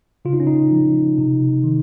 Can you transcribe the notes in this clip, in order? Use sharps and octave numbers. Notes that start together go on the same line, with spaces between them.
C#3 F4
D#4
C#4
D#4
F3
C3
D#3